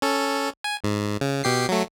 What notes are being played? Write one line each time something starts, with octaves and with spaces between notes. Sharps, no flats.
C#4 A4
G#5
G#2
C#3
B2 G4 C7
F#3 A3